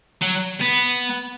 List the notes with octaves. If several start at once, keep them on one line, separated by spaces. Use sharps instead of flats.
F#3
B3